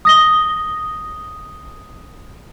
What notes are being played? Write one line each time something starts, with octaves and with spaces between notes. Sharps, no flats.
D#6 A#6 G7